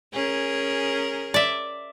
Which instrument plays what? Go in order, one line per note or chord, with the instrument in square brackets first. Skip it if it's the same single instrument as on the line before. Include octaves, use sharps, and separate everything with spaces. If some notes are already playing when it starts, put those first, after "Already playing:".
[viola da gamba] C#4 G#4 A#4
[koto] D5 E5